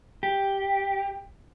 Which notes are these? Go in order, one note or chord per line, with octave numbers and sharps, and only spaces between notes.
G4